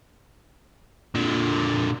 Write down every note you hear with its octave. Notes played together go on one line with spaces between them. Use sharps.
A#2 D3